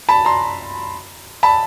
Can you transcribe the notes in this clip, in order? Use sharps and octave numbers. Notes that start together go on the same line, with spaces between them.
A5 B5
A#5 C6
A5 B5